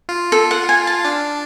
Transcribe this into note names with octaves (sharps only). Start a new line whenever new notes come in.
F4
A4
F#5
G#5
A5
D4